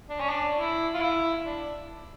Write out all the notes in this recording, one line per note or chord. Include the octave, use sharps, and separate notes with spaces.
D4
C#4
D4
E4
F4
E4
D4